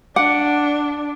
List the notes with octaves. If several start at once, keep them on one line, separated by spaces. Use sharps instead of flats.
D4 F#5 D6